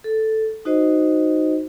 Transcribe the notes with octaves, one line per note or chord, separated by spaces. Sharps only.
A4
D#4 F#4 C5 D#5